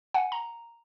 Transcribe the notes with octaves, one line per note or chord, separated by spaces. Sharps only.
F#5 G#5
A#5